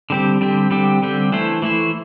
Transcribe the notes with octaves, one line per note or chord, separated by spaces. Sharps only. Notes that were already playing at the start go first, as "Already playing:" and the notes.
D3 G3 C4 G4
D3 G3 C4 G4
D3 G3 C4 G4
D3 G3 C4 G4
E3 A3 E4 C5
E3 A3 E4 C5